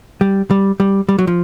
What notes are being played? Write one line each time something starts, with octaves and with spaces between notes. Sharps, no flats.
G3
G3
G3
G3
F#3
F3